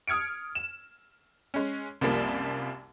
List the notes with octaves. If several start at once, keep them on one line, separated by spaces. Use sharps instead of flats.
D#6 F6 G#6 C#7 D7
E7
G#3 C#4
C2 F#2 F3 G3 A#3